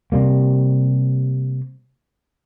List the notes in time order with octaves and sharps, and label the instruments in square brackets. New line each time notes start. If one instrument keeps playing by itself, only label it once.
[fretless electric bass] C3 G3 A#3